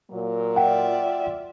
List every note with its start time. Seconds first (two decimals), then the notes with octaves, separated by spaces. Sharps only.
0.11 A#2 F#3 A#3
0.56 F4 D5 E5 F#5 G5